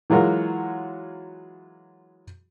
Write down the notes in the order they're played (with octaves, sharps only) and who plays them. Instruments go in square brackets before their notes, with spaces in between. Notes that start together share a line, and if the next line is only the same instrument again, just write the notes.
[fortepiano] E3 F#3 G#3 F4 F#4 A#4